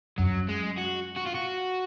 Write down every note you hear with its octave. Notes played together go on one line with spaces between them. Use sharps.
F#2 F#3
G#3
F#4
F#4
F4
F#4